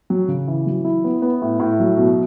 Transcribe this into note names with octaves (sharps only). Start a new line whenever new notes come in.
F#3
C#3
E3
F#3
E4
B3
B3
A2
A2
F#3
B2